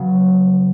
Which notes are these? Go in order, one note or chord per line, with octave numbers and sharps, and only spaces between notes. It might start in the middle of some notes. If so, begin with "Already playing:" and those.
Already playing: C#3 F#3 B3